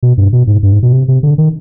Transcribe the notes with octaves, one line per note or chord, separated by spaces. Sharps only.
B2
G2
B2
G#2
G2
G#2
B2
C3
C3
D3
D#3